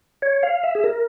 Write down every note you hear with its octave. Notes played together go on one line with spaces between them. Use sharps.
C#5
F5
E5
G#4
A#4